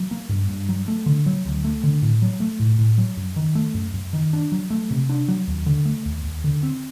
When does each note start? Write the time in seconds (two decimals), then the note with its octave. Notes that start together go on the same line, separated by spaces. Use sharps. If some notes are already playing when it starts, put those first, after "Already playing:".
Already playing: F#3
0.11 A#3
0.29 G2
0.49 G2
0.69 F#3
0.88 A3
1.06 D3
1.26 F#3
1.45 D2
1.64 A3
1.83 D3
2.02 A2
2.22 F#3
2.40 A3
2.60 A2
2.79 A2
2.98 F#3
3.17 F#2
3.36 D#3
3.55 A3
3.75 F#2
3.94 F#2
4.13 D#3
4.33 D4
4.52 F#3
4.70 A3
4.91 C3
5.09 D4
5.28 F#3
5.47 D#2
5.66 D3
5.85 A3
6.05 D#2
6.24 D#2
6.44 D3
6.63 C4